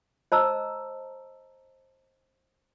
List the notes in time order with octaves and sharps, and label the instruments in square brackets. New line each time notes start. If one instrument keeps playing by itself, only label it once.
[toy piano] C5 D#5 A5 A#5 E6